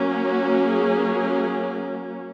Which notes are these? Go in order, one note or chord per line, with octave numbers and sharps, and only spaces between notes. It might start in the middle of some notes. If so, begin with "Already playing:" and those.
Already playing: F#3 A#3 C#4
F#4
G#4